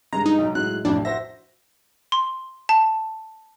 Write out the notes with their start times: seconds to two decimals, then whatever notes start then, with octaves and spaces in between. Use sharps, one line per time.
0.13 G2 G#3 A#5
0.26 D#4
0.38 B1 G#2
0.55 A2 F#3 G#3 F#6
0.85 A1 F2 A2 D4
1.05 F#4 C5 E5 A#6
2.12 C6
2.69 A5